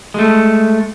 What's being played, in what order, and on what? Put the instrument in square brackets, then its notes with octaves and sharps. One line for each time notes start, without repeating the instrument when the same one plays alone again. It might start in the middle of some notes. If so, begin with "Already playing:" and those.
[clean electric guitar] G#3 A3